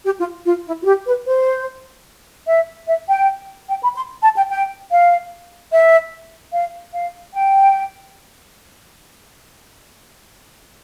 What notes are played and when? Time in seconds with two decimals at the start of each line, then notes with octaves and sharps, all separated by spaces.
0.05 G4
0.18 F4
0.45 F4
0.66 E4
0.81 F4
0.86 G4
1.06 B4
1.26 C5
2.47 E5
2.88 E5
3.09 G5
3.69 G5
3.83 B5
3.96 C6
4.23 A5
4.36 G5
4.50 G5
4.91 F5
5.71 E5
6.53 F5
6.93 F5
7.33 G5